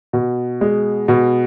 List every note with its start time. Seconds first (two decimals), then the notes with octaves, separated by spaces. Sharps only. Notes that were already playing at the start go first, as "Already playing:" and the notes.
0.13 B2
0.61 G#3
1.08 B2